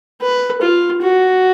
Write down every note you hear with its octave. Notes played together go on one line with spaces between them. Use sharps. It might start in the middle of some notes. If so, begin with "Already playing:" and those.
B4
F4
F#4